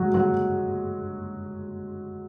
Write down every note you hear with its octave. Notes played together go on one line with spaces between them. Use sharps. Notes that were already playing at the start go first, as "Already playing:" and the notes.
Already playing: F#3 G#3 F#4
F#3 F#4